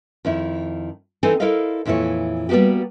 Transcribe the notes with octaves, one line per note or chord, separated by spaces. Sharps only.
F2 D#3 E4
E3 C4 D#4 A4 G#5
E4 A4 A#4 C5 D#5 F5
F2 A#2 E3 E4 C#5
G3 A#3 B3 F#4 G4